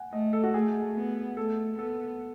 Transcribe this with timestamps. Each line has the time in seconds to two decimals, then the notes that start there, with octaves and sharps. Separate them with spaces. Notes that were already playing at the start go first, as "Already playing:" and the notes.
Already playing: F#5 G#5
0.12 A3 D#5
0.33 A4
0.44 F#4
0.54 A3 G#4
0.96 B3
1.37 A3 A4
1.78 B3 A4